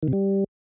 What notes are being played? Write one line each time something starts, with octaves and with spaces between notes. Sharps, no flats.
D#3
C3
G3